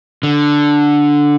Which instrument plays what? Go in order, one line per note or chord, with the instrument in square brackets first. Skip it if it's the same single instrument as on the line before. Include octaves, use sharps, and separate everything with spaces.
[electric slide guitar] D3